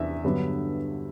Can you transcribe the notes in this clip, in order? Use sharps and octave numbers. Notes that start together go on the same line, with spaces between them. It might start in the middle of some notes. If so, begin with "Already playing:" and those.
Already playing: E2 C3 D4 E5
G2 D3 F#3 B3